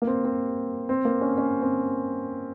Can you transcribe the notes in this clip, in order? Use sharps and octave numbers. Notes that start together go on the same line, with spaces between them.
A#3
C4
C4
C4
A#3
C#4
C#4
C4